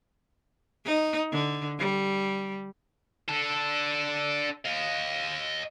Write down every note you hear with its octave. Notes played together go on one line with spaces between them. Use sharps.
D#4
D3
G3
D4 A4
D#5 F5